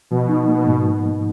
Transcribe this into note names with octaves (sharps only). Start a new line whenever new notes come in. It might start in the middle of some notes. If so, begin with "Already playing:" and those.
B2 F3
D#4
B2 A#3
G#2